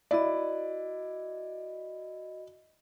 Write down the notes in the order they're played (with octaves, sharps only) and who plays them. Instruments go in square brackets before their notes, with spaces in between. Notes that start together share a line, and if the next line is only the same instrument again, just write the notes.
[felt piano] E4 D5 [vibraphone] F#4 D#5